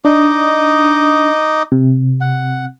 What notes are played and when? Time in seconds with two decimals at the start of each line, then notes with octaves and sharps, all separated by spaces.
0.05 D4 D#4 D#5 D6
1.72 C3
2.21 F#5